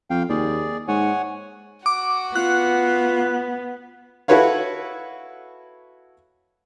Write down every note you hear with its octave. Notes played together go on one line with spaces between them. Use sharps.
F2 F5 G5
D#2 G#4 D5
G#2 C#5 F#5 G#5
F#4 F#5 D6
B3 F4 F#6
E4 F#4 A4 B4 C#5 F5